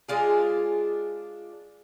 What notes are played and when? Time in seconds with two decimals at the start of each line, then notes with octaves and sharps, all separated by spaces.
0.09 G#3 D4 F4 G#4